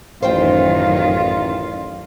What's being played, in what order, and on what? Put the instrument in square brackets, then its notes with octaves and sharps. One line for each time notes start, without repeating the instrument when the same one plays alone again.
[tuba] A1 [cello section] F#2 D#3 [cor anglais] F4 [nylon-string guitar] C5 G5